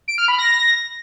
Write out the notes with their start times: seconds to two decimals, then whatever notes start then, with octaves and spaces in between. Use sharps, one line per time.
0.08 D7
0.18 F6
0.28 B5
0.39 A#6